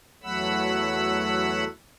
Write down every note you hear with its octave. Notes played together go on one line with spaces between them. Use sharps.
E2 F#3 A3 F#5 B5 E6